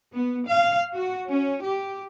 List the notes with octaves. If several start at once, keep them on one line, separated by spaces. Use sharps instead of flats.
B3
F5
F#4
C#4
G4